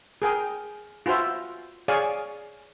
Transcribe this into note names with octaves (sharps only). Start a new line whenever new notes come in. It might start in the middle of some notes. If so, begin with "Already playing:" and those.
G#4 A#4 G5
F4 F#4 B4 C5 E5
G#4 C#5 D5 F5 G#5